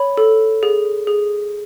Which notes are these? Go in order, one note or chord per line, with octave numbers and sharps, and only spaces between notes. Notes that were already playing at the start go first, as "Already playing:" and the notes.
Already playing: C#5 B5
A4
G#4
G#4